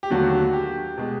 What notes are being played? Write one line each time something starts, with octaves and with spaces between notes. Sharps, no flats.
G4
D#2 D3 F#3 A3 F#4
G4
B2 G#3